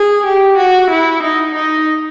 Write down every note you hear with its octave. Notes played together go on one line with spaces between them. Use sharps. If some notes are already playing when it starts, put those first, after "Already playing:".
Already playing: G#4
G4
F#4
E4
D#4
D#4